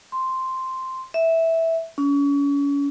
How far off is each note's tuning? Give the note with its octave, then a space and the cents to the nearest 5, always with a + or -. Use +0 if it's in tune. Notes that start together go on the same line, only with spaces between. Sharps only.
C6 -5
E5 -10
C#4 +35